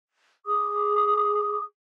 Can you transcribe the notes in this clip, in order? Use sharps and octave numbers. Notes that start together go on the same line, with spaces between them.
G#4 D6 D#6